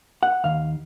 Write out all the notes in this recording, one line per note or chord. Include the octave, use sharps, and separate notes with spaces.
F#5
D#2 D#3 F5